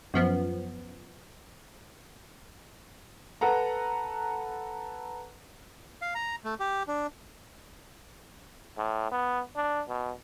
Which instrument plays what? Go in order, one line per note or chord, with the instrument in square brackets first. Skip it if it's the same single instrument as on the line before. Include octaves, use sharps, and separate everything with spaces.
[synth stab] F#2 F3 B3
[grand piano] A4 B4 F#5 A#5
[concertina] F5
A#5
A3
G4
D4
[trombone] A2
B3
D4
B2